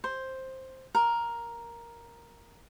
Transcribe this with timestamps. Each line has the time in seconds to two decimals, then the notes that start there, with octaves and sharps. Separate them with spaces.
0.04 C5
0.95 A#4